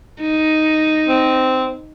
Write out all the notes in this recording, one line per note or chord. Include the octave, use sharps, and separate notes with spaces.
D#4
C4